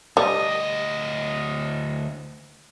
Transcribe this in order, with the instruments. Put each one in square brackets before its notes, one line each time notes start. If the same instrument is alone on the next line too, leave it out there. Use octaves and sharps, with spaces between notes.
[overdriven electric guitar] D2 D#5 [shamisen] G3